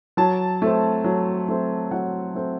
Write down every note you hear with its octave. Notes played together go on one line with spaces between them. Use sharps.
F#3 A5
A3 C4
F#3
A3 C4
F#3 F#5
A3 C4